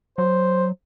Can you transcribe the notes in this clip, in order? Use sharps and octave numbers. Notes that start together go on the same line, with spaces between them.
F#3 C5